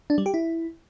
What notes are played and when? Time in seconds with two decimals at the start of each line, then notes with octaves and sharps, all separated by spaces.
0.10 D4
0.18 G3
0.26 G4
0.34 E4